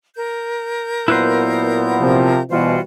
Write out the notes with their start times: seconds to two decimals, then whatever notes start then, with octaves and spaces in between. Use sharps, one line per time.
0.15 A#4 G6
1.08 A#2 F#3 B3 E4 B4 C5
2.00 C3 F3
2.50 B2 E3 G3 F4 F#4 C5